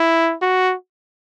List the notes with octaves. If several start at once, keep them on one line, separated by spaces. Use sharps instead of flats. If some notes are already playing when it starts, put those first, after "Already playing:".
Already playing: E4
F#4